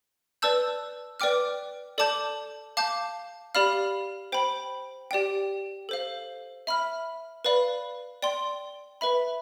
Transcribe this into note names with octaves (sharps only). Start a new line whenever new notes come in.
B4 D5 A5 E6 G6
B4 D5 G5 D6 F6
A4 D5 A5 D6 G6
F5 A5 D6 G6
G4 D5 F5 B5 F6
C5 G5 B5
G4 D5 G5
A4 C5 F5
E5 B5 F6
B4 D5 F5 B5
D5 G5 C6
B4 E5 B5